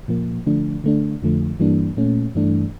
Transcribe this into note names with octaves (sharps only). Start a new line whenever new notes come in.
A#2 F3 A#3
D3 F3 A3 D4
D3 A3 D4
F2 D3 F3 A3
G2 E3 G3 A#3 D4
A#2 A3 C#4
G2 E3 A3 D4